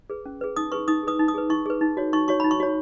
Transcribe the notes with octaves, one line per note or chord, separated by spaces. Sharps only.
G#4 B4
C#4
G#4 B4
D#4 D#6
G#4 B4 C#6
D#4 D#6
G#4 B4 D#6
D#4
D#6
G#4 B4
D#4 C#6
G#4 B4
D#4
F#4 C#5
D#4 C#6
F#4 C#5 C#6
D#4 B5
C#6
F#4 C#5